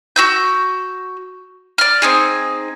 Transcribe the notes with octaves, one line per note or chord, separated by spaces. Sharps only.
F#4 E6 G6
D5 F6
C4 D#4 G#4